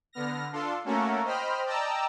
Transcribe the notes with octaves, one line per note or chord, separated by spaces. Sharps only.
D3 B3 F6 A#6
D4 F4 A4 C6
A3 A#3 C#4 F#4 A4 A#4
C5 D#5 G5 B5 F6
D5 D#5 G5 A5 A#5 E6